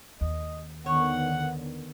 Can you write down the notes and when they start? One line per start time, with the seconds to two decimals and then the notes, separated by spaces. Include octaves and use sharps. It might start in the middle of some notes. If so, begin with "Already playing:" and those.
0.21 D#2 D#5
0.86 D3 D#3 B3 C#5 F#5